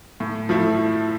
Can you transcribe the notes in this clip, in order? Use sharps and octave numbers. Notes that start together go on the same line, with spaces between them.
A2
F3 A3 E4